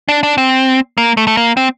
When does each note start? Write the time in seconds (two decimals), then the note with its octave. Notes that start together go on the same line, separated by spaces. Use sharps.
0.08 D4
0.23 D4
0.38 C4
0.98 A#3
1.17 A3
1.27 A3
1.37 A#3
1.57 C4